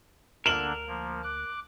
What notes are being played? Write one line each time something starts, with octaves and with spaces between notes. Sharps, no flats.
D2 D3 A#3 D4 A#4 E7 F#7
F3 A#3
D6 F#6